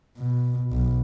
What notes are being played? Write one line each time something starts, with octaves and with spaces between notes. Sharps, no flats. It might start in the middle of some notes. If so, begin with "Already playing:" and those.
B2
B1